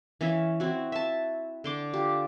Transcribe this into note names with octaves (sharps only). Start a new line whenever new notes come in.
E3 C#4 E5
C4 E4 F#4
E5 A5
D3 C6 D6
F4 G4